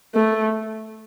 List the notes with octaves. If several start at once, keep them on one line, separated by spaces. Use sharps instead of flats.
A3